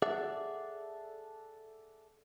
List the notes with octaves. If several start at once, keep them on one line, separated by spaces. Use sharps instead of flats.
G#4 A4 D5 E5 F#5